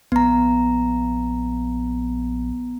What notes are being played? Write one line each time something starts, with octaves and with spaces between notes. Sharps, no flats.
A#1 B3 A#5